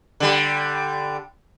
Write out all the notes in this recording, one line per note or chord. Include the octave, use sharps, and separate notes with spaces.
D3 G3